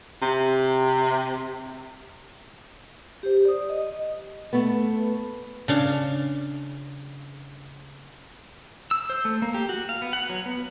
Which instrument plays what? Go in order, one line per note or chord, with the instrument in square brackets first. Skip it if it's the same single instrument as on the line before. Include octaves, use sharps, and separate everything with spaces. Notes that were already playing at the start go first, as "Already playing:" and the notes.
[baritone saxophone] C3
[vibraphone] G4 C5
D5 D#6
D#5
[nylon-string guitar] A3 B3
[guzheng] C#3 D4 F5
[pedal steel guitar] E6
C5
A3
A#3
G4
F#4
F5
B3
F#5
F#3
B3